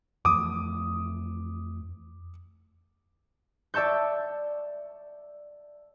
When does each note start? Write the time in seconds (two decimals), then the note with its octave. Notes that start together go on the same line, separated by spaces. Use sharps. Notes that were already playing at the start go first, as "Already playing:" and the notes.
0.25 F2 E3 A3 D6 D#6
3.74 D5 E5 A5 C#6 G6